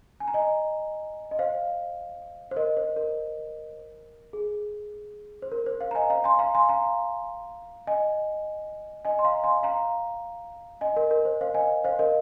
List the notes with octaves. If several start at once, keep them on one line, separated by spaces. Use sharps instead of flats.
G#5
A#5
D#5 G#5
D#5
C5 F5
C5
A#4 D#5
C5
A#4
G#4
C5
A#4
C5
C5 F5
A#5
D#5 G#5
F5 A#5
G#5 C6
F5 A#5
G#5 C6
F5 A#5
D#5 G#5
D#5 G#5
C6
F5 A#5
G#5 C6
F5 A#5
D#5 G#5
A#4 D#5
A#4
C5
C5 F5
D#5 G#5
C5 F5
A#4 D#5